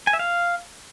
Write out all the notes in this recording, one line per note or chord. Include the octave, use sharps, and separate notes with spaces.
G#5
E5
F5